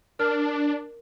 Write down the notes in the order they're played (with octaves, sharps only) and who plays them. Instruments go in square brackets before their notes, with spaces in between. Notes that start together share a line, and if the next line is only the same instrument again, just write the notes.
[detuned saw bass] D4 [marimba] A#4 F6